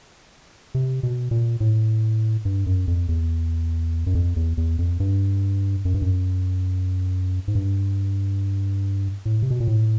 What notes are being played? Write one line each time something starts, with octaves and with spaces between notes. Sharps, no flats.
C3
B2
A#2
A2
G2
F#2
F2
E2
F#2
F2
E2
E2
F2
G2
F#2
G2
F#2
G#2
G2
A2
C3
B2
A#2
A2